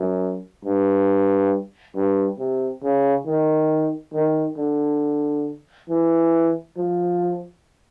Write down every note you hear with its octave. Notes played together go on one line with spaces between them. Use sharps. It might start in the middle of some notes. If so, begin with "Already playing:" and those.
Already playing: F#2
G2
G2
C3
C#3
D#3
D#3
D3
E3
F3